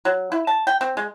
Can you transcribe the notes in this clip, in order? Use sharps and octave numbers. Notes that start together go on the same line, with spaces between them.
F#3
E4
A5
G5
C4
G#3